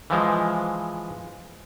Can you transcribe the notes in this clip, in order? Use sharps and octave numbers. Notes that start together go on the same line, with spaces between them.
E3 F3 G#3